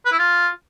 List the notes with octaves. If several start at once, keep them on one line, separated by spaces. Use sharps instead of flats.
B4
E4
F4